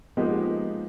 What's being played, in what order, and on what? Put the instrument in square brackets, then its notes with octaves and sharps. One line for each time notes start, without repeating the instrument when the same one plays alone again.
[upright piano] F3 G#3 A#3 B3 D#4 G4